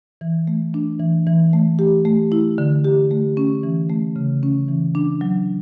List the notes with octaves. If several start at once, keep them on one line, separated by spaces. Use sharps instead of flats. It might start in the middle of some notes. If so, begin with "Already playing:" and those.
E3
A3
D4
E3
E3
A3
G4
A3
E4
D3
G4
A3
C#4
E3
A3
C#3
C#4
E3
D4
F#3